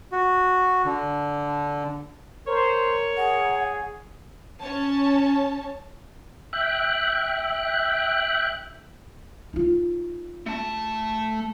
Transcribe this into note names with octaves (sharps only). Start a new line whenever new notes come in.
F#4
D3
A#4 C5 C#5
G#4 F#5
C#4 C#5 A5
E5 G5 F#6
D#4 F4
A3 A5